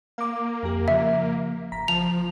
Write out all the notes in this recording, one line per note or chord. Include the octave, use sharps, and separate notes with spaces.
A#3 F5 D6
F2 G4
C#3 F3 E5
G#1 A#5 B6
F3 A5 F7